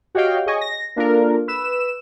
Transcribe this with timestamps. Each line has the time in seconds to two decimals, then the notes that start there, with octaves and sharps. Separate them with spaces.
0.15 F#4 G4 C#5 D#5 F5 G5
0.46 G#4 C#5 D#5 G#5 C#6
0.61 A#6
0.96 A#3 D4 F4 A4 A#4
1.48 B4 E6 E7